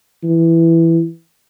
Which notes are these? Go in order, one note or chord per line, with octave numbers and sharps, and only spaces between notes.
E3